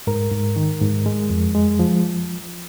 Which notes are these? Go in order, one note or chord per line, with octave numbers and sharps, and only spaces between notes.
G#2 A#4
G#2
D#3
G#2
G#3
F2
G#3
F3